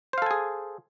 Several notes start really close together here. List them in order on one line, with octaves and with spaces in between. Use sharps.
C5 F5 A4 G#5 G#4